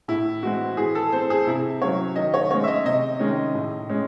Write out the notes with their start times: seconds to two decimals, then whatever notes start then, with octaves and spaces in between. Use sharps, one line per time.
0.08 A2 E4
0.43 E3 G#3 C4 F#4
0.77 E3 G#4
0.95 A4
1.12 C4 C5
1.30 G#4
1.47 C3 E4
1.82 F#3 C#4 C#5
2.16 D#3 D#5
2.34 C#5
2.51 G#3 C#4 C#5
2.64 E5
2.68 D#5
2.86 C3 D#5
3.19 D#3 G#3 C#4
3.55 A2
3.89 G#3 C#4